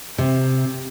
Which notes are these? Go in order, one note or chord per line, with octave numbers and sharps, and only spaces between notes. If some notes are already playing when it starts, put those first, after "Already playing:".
C3